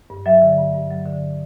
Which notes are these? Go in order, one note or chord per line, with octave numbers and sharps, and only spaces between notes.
G2
F#3 E5
D3
G2
G2
F#3
D3